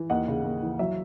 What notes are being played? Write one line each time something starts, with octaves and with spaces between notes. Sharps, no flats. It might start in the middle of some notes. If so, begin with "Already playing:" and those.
Already playing: E3
D#2 D#5 F#5
C#3
D#2
E3
F#3 E5